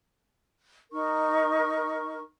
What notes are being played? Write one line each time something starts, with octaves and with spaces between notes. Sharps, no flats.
D#4 A#4 C#6